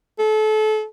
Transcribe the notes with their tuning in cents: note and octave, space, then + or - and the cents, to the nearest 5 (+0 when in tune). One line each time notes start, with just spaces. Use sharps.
A4 -30